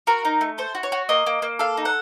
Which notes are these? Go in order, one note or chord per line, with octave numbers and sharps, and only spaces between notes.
F#4 A#4
D#4
A3
A4 C5
F#4
C#5
F#4
A#3 D#5
A#3
A#3
A4 F5
D#4
F#5